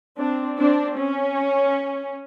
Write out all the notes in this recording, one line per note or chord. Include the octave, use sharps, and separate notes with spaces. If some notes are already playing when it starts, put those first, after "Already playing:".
C4 D4
C4 D4
C#4